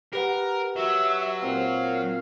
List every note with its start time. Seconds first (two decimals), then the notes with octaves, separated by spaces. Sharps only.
0.13 G4 A#4 B4 F#5
0.76 F#3 E5
1.42 A#2 C4 F5